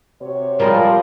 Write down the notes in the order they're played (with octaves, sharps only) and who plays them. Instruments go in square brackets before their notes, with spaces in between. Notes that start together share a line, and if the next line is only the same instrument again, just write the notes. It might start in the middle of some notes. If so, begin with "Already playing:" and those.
[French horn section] C3 F#4 C#5
[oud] F3 G#3 C4 [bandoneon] G3 [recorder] A#4